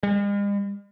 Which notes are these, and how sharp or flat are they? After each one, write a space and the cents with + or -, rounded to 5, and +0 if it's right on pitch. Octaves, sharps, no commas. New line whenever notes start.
G#3 -45